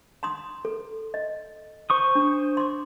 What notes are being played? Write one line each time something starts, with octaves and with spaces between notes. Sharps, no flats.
A#5 C6 D#6
A4
D#5
C5 C#6 D#6
D4
C6 D6